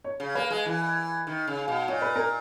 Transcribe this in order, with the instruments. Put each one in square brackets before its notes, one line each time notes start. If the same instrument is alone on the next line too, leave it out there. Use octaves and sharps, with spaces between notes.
[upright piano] C#5
[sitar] C#3
[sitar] A#3 [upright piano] B4
[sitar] G#3
E3
D#3
C#3
B2
[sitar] A#2 [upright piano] C#5
[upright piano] B4
A#4